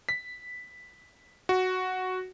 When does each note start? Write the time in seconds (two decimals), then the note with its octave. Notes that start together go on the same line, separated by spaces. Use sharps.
0.09 B6
1.49 F#4